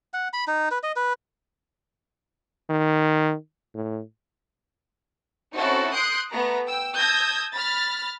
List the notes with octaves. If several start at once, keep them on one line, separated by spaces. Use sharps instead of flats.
F#5
B5
D#4
B4
D#5
B4
D#3
A2
C4 C#4 D#4 E4 F#4 A4
C6 D#6 F#6 G6 C7 D7
A3 B3 A#5
G5 E6
A5 D#6 E6 G6 G#6 A#6
B5 F6 A6